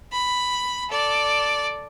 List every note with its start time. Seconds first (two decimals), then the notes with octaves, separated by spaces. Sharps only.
0.12 B5
0.89 A4 D5